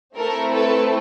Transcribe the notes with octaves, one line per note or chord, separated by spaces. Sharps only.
A3 C4 E4 A4 A#4
A4 B4